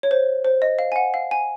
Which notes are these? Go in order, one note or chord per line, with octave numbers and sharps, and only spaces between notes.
C#5
C5
C5
D#5
F5
G#5
F#5
F5
G#5